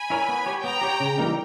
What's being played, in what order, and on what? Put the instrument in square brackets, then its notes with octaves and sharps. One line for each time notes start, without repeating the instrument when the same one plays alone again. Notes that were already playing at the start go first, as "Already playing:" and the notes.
Already playing: [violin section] G#5 B5
[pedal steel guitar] E4 A#4 C#5
B3
G4 C#5
[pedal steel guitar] B3 [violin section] G5 A#5
[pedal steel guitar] G4 C#5
C#3
E3 G3 A#3 D#4